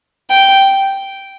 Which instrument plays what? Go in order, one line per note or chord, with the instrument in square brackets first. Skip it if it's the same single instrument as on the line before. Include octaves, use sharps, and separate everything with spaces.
[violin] G5